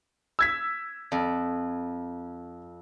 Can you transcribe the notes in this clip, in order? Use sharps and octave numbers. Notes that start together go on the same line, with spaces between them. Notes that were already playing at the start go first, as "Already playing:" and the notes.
E6 G#6 B6
F2